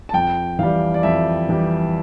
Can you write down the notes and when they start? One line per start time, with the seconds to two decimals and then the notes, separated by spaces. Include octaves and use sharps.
0.09 A5
0.14 F2 G5
0.59 E3 G3 F5
0.94 D5
1.03 F2 E5
1.49 E3 G3